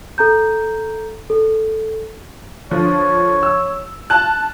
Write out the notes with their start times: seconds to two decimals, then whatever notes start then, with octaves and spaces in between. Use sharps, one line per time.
0.18 A4 A#5 G6
1.30 A4
2.71 D3 F3 C#5
3.43 E6
4.10 A5 F6 F#6